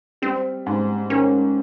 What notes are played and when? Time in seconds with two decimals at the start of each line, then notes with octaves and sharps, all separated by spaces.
0.22 G3 C4
0.66 G#2
1.10 D#3 C#4